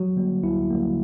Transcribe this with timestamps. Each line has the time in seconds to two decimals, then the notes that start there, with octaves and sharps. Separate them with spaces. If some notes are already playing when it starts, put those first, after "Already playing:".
Already playing: F#3 F#4
0.17 D3 G3 A#3
0.43 D2 E4
0.71 D3 G3 A#3